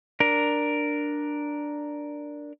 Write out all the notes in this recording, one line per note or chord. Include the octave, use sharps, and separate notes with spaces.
D4 A#4